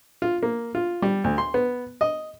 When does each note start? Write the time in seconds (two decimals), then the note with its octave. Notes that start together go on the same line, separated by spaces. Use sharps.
0.22 F4
0.43 A#3
0.75 F4
1.02 G3
1.24 D2
1.38 C6
1.54 B3
2.01 D#5